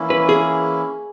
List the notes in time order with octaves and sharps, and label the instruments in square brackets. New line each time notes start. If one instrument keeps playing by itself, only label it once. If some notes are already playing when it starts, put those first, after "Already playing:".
Already playing: [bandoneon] E3 A#3 C#4 E4
[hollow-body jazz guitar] B4
G#4